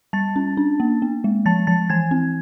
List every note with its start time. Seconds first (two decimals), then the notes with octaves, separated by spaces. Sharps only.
0.13 G3 A5 A6
0.36 C#4
0.57 D4
0.80 A#3
1.02 B3
1.24 G#3
1.46 F3 A5 A6
1.67 F3 A5 A6
1.90 E3 G#5 G#6
2.11 C4